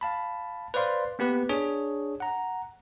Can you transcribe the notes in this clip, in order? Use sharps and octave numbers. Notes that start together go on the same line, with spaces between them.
F5 A5 B5
B4 C5 D5 F5 C6
A#3 B3 G4 B4
D4 G#4 C#5
F#5 A#5